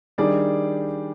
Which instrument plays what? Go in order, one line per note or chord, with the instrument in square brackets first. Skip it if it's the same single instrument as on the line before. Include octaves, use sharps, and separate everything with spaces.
[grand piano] D#3 G3 D4 G#4 D5